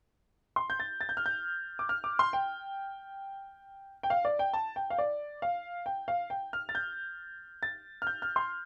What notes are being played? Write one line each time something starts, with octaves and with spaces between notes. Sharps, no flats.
C6
G6
A6
A6
G6
F6
G6
D6
F6
D6
C6
G5
G5
F5
D5
G5
A5
G5
F5
D5
F5
G5
F5
G5
F6
A6
G6
A6
F6
G6
F6
C6